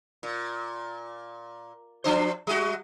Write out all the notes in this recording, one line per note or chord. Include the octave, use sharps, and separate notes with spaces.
A#2
F3 D4 C5
G3 F#4